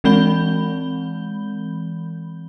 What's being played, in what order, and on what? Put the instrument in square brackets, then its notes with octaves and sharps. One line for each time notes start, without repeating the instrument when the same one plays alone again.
[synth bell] E3 G#3 C4 B5 G6 G7